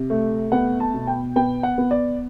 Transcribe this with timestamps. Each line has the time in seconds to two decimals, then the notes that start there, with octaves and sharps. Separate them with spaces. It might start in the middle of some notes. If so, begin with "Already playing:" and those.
Already playing: C3
0.10 A3
0.52 B3 F#5
0.80 A5
0.94 B2
1.07 G5
1.36 B3 G5
1.63 F#5
1.78 B3
1.91 D5